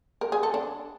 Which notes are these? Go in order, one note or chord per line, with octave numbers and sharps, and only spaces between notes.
A#4
G#4
A4
D4